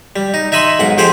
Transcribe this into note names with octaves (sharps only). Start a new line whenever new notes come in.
G3
D#4
D#4 E5 G#5 B5 C6
B1 G#2 F#5
F2 G4 G#4 C5 F#5 G5